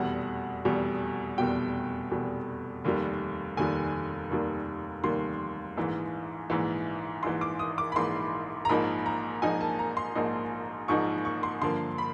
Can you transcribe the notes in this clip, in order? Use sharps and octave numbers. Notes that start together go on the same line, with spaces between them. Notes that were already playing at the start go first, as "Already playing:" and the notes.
Already playing: F1 E2 B2 G3 F#5
F1 E2 B2 G3
F1 E2 B2 G3 G5
F1 E2 B2 G3
F1 D#2 D#3 G3
F1 D#2 D#3 G3 G#5
F1 D#2 D#3 G3
F1 D#2 D#3 G3 C6
A#1 G#2 E3
A#1 G#2 E3
A#1 G#2 E3 C6
D6
D#6
D6
B5
A#1 G#2 E3 C6
A#5
A#1 G#2 F3 A#3 D#4 B5
A#5
A#1 G#2 F3 A#3 D#4 G#5
A5
A#5
C6
A#1 G#2 F3 A#3 D#4
A#1 G#2 F3 A#3 D#4 C#6
C#6
C6
G2 D3 F3 A#3 C6
B5